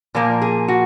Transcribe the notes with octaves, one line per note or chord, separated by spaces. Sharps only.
A#2 F3 A#3 A#4
G#4
F#4